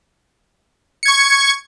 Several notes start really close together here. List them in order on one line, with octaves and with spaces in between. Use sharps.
C#7 G#6 C#6